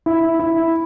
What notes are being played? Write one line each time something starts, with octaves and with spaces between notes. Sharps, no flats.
E4
E4